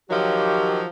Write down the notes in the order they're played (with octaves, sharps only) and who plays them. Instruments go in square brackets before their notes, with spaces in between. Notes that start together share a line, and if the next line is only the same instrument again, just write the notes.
[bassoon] D#3 [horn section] F3 F#3 [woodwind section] G4